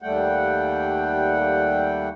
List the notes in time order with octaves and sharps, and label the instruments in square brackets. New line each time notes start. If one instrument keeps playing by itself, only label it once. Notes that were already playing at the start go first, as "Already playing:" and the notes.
[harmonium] D#2 G3 A3 F#5 G5